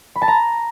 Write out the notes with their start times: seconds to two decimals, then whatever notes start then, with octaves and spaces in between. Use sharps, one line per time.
0.16 B5
0.22 A5
0.28 A#5